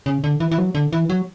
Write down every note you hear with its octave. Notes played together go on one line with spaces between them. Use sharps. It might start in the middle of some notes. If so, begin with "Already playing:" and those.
C#3
D3
E3
E3
F#3
D3
E3
F#3